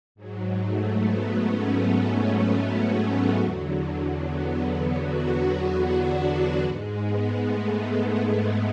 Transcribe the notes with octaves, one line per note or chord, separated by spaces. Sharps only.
G#2 F#3
A3
B3
C#4
B3
A3
E2 D3 F#3
B3
F#4
D4
G#2 G#3
B3
A3
B3